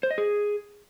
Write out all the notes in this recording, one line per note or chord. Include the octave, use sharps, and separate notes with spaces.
C5
D#5
G#4